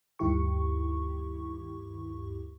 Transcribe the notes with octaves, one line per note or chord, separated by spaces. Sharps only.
D2 G2 D#3 E4 G4 C#6